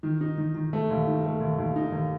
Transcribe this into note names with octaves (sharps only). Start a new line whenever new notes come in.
D#3
D#4
D#3
D#3
A3
D#2
D#3
A3
D#2
D#2
D#4
D#2